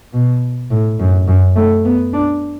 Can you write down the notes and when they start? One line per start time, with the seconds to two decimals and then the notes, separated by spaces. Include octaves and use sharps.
0.13 B2
0.70 A2
0.99 F#2
1.27 F#2
1.56 A3
1.85 B3
2.13 D4